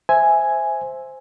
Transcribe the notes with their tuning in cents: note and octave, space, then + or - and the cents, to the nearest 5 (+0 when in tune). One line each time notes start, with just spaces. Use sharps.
C5 +0 E5 +0 G#5 +0